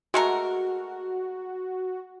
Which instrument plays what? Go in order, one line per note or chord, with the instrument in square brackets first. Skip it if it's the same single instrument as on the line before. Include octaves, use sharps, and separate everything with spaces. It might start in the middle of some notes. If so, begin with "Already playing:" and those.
[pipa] G#3 A3 A#4 [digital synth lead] F#4